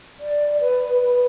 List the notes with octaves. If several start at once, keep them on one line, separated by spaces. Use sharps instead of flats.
D5
B4
B4